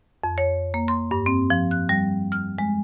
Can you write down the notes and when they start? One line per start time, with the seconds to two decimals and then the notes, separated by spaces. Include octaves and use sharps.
0.24 F2
0.38 C#5
0.74 A#3
0.88 C6
1.11 G2
1.26 C4
1.50 F3
1.71 F#6
1.89 G3
2.32 F6
2.59 G#3